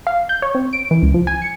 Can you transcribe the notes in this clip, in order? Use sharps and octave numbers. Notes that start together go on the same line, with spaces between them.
F5
G6
C#5
C4
D7
E3
C#2
F3
G#5
C#7